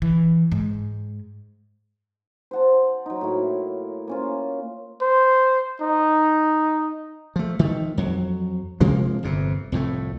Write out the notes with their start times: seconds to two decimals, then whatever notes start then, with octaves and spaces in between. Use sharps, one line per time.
0.02 E3
0.52 G#2
2.51 C5 F#5 A5
3.06 F#3 D#4
3.21 A2 A#3 E4
4.07 A#3 C#4 F4
5.01 C5
5.81 D#4
7.36 F3 A3
7.59 D#3 F3 A3
7.97 F2 F#3
8.80 C3 F3 G#3 A#3
9.23 G1 F2 C3
9.72 C2 F2 A2 A3